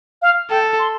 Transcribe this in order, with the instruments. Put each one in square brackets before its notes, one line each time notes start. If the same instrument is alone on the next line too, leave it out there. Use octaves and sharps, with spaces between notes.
[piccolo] F5
[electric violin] A4 [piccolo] G5
[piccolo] C6